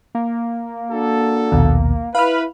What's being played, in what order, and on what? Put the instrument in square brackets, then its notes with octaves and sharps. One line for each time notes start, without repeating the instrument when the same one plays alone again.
[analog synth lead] A#3
[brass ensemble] D4 F#4 A4
[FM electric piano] A#1 D#2 B2
[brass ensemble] E4 B4 [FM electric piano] F5 F6 [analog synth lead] B5